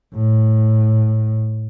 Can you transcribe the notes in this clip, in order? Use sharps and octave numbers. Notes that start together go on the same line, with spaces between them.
A2